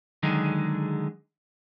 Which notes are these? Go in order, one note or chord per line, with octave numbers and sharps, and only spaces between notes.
D3 D#3 F#3 G#3 D#4 G#4